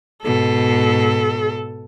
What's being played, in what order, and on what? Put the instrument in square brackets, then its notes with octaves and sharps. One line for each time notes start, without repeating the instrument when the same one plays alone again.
[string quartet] G#2 B2 [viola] A4